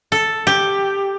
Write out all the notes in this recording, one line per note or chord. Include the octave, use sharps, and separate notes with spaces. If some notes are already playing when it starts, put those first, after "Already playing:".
A4
G4